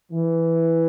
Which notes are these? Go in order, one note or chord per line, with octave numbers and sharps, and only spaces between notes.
E3